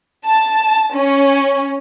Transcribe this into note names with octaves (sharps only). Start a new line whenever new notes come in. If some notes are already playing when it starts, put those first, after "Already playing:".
A5
C#4